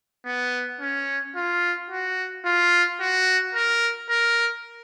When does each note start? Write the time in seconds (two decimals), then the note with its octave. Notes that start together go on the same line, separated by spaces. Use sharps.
0.26 B3
0.81 C#4
1.36 F4
1.90 F#4
2.46 F4
3.00 F#4
3.55 A#4
4.10 A#4